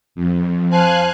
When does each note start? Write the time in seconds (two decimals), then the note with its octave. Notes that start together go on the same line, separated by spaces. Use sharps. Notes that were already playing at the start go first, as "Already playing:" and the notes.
0.15 F2
0.70 F3 F5 G#5 F#6